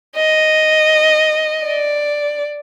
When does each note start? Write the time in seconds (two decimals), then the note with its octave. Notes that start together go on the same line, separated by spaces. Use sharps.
0.16 D#5
1.64 D5